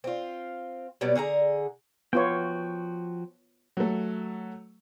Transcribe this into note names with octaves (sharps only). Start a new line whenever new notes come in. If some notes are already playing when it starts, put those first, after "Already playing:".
C4 F4
B2 F#3 G3 B3
D3 G#4 F5 A#5
F3 B3 F4 F#4 C#5 G5
F#3 A3